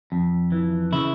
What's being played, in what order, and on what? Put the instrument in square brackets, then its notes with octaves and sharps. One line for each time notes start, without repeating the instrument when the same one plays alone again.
[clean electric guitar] F2
E3
C#3 E4